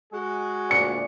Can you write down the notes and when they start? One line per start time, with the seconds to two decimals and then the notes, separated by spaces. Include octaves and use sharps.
0.12 G#3 F#4 G#4
0.71 D2 A#2 D5 C#7